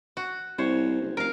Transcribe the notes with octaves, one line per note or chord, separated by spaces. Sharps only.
F#4
C2 C5 C#5
F#1
F1 A#4 F5